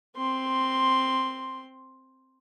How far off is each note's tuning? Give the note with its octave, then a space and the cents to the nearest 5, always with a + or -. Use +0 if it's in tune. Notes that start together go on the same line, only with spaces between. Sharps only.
C4 +5 C6 +0